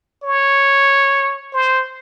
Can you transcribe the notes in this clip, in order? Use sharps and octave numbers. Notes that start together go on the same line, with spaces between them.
C#5
C5